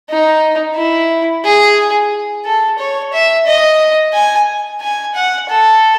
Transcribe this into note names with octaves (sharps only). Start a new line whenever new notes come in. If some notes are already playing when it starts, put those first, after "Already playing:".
D#4
E4
G#4
A4
C#5
E5
D#5
G#5
G#5
F#5
A4